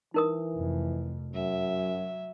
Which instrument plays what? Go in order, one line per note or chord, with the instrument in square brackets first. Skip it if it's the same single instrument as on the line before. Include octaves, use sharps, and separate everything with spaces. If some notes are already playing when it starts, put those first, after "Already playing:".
[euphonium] E3 [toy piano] D#4 A#4 D#6
[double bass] F1 F2
[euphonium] F#2 [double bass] F#3 [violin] E5